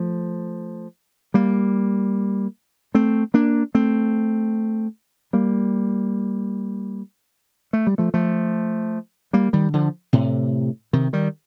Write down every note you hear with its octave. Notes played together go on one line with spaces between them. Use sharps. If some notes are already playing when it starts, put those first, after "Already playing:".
Already playing: F3 A3
G3 A#3
A3 C4
A#3 D4
A3 C4
G3 A#3
A3
G3
F3 A3
F3 A3
G3 A#3
D#3 G3
D3 F3
A2 C3
C3 D#3
D#3 G3